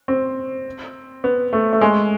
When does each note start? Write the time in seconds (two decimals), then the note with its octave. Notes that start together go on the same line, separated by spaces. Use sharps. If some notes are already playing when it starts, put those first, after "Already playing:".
0.08 C4
1.24 B3
1.53 A3
1.73 A3
1.81 G#3